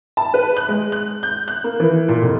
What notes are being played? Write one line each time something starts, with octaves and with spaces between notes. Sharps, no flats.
A5
B4
F#6
G#3
F#6
G6
F#6
A#3
E3
A#2
F1